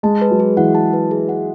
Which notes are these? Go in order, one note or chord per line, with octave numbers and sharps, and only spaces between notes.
G#3 A5
B4
F#3
G#4
E3 F#5
A5
B4
G#4
F#5